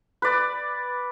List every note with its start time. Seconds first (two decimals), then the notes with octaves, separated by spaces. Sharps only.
0.22 B4 D5